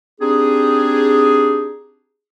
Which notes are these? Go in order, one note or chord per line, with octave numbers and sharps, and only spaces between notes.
C4 D4 D#4 G4 G#4